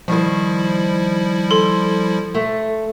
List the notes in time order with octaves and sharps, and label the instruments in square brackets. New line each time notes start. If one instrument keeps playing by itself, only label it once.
[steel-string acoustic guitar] D#3 C5 [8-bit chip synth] F3 G3 E4
[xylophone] A4 C6
[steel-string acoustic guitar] A3